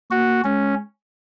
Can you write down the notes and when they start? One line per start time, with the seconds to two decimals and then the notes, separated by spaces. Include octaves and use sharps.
0.10 A#3 F#4
0.44 G#3 C#4